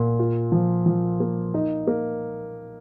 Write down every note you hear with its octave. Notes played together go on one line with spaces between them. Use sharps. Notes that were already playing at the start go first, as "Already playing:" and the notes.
Already playing: A#2
F4
F3
F3
A#3
D#4
A#3